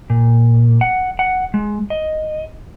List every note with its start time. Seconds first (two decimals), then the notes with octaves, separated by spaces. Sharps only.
0.10 A#2
0.81 F#5
1.19 F#5
1.54 G#3
1.90 D#5